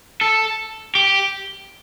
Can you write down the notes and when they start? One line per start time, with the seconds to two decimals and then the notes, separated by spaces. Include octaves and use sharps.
0.21 A4
0.95 G4